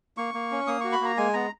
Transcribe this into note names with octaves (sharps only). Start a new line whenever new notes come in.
A#3 C#6
A#3
C#4
A#3 D#6
F#4 C#6
B5
A#3 A#5
G#3 G#5
B3 A#5